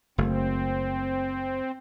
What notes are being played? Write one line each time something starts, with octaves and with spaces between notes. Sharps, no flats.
F#1 A3 C4